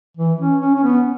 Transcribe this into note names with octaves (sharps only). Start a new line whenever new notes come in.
E3
C#4
C#4
C#4
B3